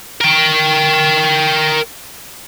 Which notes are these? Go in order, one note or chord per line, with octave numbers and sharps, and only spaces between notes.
A#4 G5